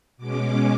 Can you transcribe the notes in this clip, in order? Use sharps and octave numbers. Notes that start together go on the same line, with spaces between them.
B2 G#3 C#4 D6